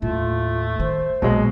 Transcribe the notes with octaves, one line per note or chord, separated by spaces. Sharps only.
D#2 A2 A3 F4
D#3 C5
A#1 B2 F#3 G#3 A#3